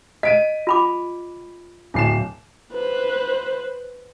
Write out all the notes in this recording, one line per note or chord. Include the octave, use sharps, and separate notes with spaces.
D#5 B6 D7 D#7
F4 B5 D6
D1 C7 E7
B4 C5